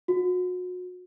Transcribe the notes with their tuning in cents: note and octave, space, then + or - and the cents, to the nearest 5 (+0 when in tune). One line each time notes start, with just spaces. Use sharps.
F#4 -35